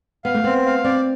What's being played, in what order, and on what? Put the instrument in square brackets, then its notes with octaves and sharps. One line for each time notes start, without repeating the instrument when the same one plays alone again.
[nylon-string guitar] B3 [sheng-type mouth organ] F5
[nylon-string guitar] A3
[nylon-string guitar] B3 [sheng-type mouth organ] C4
[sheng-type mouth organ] F5
[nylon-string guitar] C4 [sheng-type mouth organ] D5